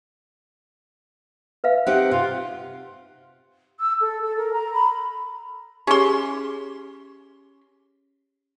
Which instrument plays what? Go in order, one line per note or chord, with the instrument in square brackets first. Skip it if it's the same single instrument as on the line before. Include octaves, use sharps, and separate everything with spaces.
[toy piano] B4 E5 F5
[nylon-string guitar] C4 D#4 G4 [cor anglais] F#5
[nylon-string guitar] C3 [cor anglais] F4
[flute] E6
A4
A4
A#4
A#5
B5
[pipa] C#4 C6 [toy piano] G4 G#4